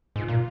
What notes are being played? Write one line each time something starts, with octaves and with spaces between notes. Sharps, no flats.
G#2 F4
A#2